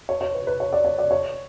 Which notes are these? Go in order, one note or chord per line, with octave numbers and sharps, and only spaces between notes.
C#5
C#5
B4
B4
C#5
D5
C#5
D5
C#5